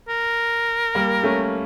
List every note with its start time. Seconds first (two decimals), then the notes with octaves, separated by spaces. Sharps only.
0.08 A#4
0.95 G3 A#3
1.23 A3 C#4